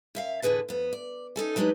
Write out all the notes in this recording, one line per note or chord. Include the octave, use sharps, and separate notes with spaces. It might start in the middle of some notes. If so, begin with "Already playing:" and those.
F#2 E5 F5
E2 A2 D3 G#4 B4 A5
F2 B3
D5
C#4 D#4 A4 G#5
F#3 G#3 D4 D#4 G4 B4